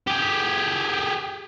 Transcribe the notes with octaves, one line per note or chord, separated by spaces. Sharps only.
G4 G#4